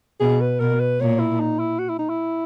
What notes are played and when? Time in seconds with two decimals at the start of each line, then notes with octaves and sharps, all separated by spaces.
0.20 B2 G#4
0.41 B4
0.60 B2 A#4
0.80 B4
1.00 A#2 C#5
1.19 E4
1.40 D#4
1.59 E4
1.79 F#4
1.89 E4
1.99 D#4
2.09 E4